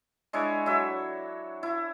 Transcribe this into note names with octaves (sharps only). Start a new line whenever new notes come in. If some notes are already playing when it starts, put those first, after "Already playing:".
G#3 D4 E4 C#5
F#3 A4 E5
E4